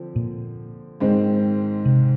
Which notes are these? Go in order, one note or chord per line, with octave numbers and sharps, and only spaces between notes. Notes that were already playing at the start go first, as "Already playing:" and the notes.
Already playing: D3 F3 C4
A#2
G#2 D#3 G#3 C4
C3